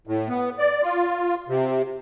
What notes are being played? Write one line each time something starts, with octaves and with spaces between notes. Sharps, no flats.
A2
B3
D5
F4
C3